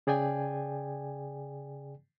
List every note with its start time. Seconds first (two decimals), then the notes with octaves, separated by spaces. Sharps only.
0.07 C#3 G#4 D5 G5 G#5